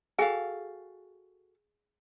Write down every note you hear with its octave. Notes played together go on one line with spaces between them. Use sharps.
F#4 G#4 A4 F5 G5 G#5